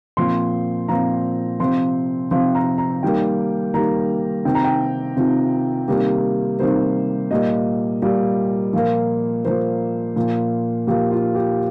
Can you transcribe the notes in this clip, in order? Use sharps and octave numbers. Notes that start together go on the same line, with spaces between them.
A#2 F3 C4 C6
A#2 F3 C4 A#5
C3 F3 C4 C6
C3 F3 C4 C6
A#5
A#5
D#3 G3 A#3 G5
D#3 G3 A#3 A#5
C3 D#3 C4 G5
A#5
G5
C3 D#3 C4 F4
C3 D#3 G3 A#3 G4
C3 D#3 G3 A#3 C5
A#2 G3 A#3 D#5
A#2 G3 A#3
A#2 F3 A#3
A#2 F3 A#3 C5
A#2 F3 A#3
A#2 F3 A#3 G4
F4
G4